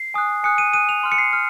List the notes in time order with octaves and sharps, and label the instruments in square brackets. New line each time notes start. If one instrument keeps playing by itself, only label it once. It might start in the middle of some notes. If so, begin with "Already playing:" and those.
Already playing: [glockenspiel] C7
G#5 D#6 F#6
G#5 D#6 F#6 C#7
D#7
G#5 D#6 F#6 D#7
F7
C6 F6
C#7
C7
F6